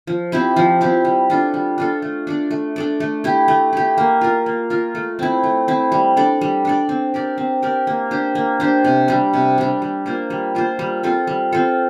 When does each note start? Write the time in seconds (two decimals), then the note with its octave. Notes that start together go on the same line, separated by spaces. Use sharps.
0.07 F3
0.32 C4 E4 G4
0.56 F3
0.81 C4 E4 G4
1.05 G3
1.30 D4 F4 A4
1.54 G3
1.78 D4 F4 A4
2.02 A3
2.27 D4 A4 D5
2.51 A3
2.76 D4 A4 D5
3.00 A3
3.24 E4 G4
3.48 A3
3.73 E4 G4
3.98 A#3
4.21 F4 A#4
4.46 A#3
4.70 F4 A#4
4.95 A3
5.19 C4 E4
5.43 A3
5.68 C4 E4
5.92 G3
6.17 D4 A4 D5
6.41 G3
6.65 D4 A4 D5
6.89 C4
7.14 G4 A#4 D5
7.38 C4
7.62 G4 A#4 D5
7.87 A#3
8.11 D4 G4 C5
8.35 A#3
8.60 D4 G4 C5
8.84 C3
9.08 G3 D4
9.33 C3
9.58 G3 D4
9.82 G3
10.06 A#3 F4 C5
10.30 G3
10.55 A#3 F4 C5
10.79 G3
11.03 C4 F4 A4
11.27 G3
11.52 C4 F4 A4